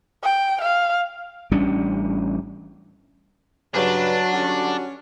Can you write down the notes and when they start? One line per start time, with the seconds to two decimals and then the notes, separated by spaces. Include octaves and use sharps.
0.23 G5
0.62 F5
1.51 A1 G3 C#4 D4
3.74 G2 C#3 F#3 D4 B4
4.33 D3 G3 C#4 F#4